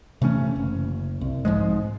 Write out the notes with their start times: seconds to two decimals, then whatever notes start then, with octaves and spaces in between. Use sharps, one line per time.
0.22 C3 E3 A3 C#4
0.56 F#1
1.21 C2
1.45 G#2 F3 G#3